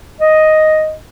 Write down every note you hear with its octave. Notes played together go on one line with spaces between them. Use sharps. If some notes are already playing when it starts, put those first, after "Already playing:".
D#5